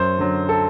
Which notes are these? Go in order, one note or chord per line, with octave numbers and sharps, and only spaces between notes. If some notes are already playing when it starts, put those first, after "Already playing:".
Already playing: F#2 C5
D3 F#3
A4